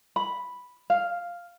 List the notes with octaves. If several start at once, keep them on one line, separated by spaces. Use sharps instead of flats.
B5
F5